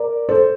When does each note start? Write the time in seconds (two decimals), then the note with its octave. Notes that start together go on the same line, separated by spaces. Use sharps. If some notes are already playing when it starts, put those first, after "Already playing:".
Already playing: A#4 D5
0.29 A4 C5